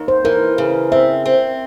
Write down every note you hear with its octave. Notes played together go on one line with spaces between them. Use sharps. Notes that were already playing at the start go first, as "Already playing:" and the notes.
Already playing: D#2
C5
E3 A#4
C#3
C4 E5
C4